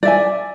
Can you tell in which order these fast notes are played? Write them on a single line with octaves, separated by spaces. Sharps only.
D5 E5 G#5